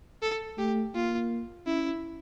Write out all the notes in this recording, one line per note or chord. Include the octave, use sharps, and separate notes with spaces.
A4
A3 G4
A#3 F4
C#4 E4